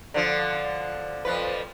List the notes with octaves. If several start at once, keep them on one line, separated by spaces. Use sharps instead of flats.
D3 F3
F2 F3 B4